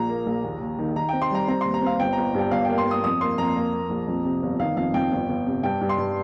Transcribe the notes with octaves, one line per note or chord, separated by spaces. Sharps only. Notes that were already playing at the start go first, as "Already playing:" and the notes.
Already playing: A#1 A#2 A#5
A#3
A#1
D#2
D#2
D#3
D#3 A#5
C4 G5
C6
G3 A#5
C4 A#5
D#2 C6
A#5
C4 F5
G1 G5
A#5
G1
G2 G5
G1 F5
A#3 G5
C6
A#3 D#6
F2 D#6
A#3 C6
F2 A#5
A#3
A#3
A#1
F2
C3
G1
D#3 F5
F2 F5
F2 G5
G1
G1
C3
G2 G5
G2
C6
G2